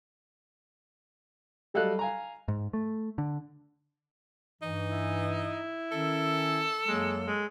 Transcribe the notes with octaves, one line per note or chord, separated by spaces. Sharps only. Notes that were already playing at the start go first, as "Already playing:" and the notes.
F#3 G3 A4 D#5 F5 F#6
F5 G#5 A#5
G#2
A3
D3
G2 E3 D#4
E4
D#3 C#4 A4
F#2 F#3 G#3 A#3
G#3